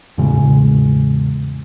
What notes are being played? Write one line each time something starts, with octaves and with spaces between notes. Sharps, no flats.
E2 A2 C#3 G#3